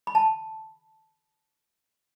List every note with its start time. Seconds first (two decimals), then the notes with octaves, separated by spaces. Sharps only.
0.07 B5
0.15 A5